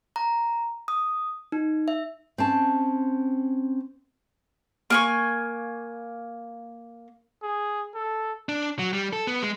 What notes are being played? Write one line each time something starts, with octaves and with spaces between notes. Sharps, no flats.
A#5
D#6
D#4
E5
C4 C#4 A5
A#3 G#5 C#6
G#4
A4
D4
F#3
G3
A4
B3
G#3